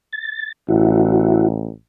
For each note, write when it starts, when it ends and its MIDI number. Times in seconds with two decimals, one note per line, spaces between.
0.13 0.52 93
0.69 1.70 33
0.69 1.48 64
0.69 1.48 66